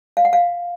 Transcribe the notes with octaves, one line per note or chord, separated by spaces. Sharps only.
F5
F#5
F5